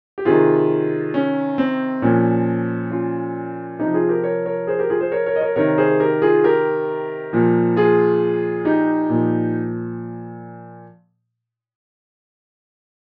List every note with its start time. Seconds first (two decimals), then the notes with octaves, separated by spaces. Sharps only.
0.18 G4
0.25 C3 D#3 F4 G#4
1.14 C#4
1.58 C4
2.02 A#2 F3 C#4
2.90 C#4 F4
3.79 C3 F3 D#4 G4
3.94 F4 G#4
4.09 G4 A#4
4.23 A#4 C#5
4.46 A#4 C#5
4.67 G#4 C5
4.79 G4 A#4
4.90 F4 G#4
5.01 G#4 C5
5.12 A#4 C#5
5.26 A#4 C#5
5.36 D#5
5.41 A#4 C#5
5.56 C3 D#3 A#4 C#5
5.78 G#4 C5
6.00 G4 A#4
6.22 F4 G#4
6.44 G4 A#4
7.33 A#2 F3
7.77 F4 G#4
8.65 D#4 G4
9.09 A#2 F3